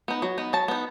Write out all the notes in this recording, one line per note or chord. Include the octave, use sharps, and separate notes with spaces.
B3 D#4
F#3
B3 D#4
F#3 A5
B3 D#4